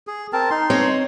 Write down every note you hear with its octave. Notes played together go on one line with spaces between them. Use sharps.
G#4
C4 A#4 A5
D#4 C6
C4 C#5 D#5